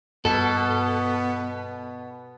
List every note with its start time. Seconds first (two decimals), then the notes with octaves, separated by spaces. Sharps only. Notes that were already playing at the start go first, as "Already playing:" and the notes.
0.25 G2 B2 B3 A4